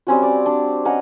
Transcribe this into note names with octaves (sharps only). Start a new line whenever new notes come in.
G3 C4 C#4 F#4
D5
D4
C#4 D#5 F#5 A#5